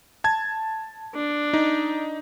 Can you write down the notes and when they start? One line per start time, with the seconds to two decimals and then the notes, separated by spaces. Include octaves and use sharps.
0.24 A5 G#6
1.15 D4
1.53 D#4